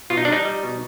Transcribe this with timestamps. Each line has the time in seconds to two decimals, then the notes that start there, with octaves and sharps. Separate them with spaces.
0.10 B2 F4
0.17 D#4
0.25 D4
0.28 G3 D#4
0.45 G3
0.63 B2